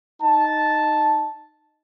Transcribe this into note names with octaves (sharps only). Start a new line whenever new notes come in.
D#4 A5